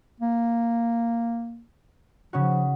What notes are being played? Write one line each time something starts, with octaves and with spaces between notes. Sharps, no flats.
A#3
C#3 F3 C#4 F#4